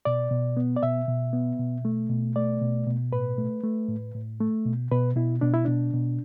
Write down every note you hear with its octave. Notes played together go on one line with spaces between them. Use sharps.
B2 D5
B2
B3
D5
B2 E5
B2
B3
B2
A3
B2
A3 D5
B2
B2
A2 B4
A3
A3
A2
A2
A3
B2
B2 B4
B2 E4
B2 D4
E4
B2 D4
B2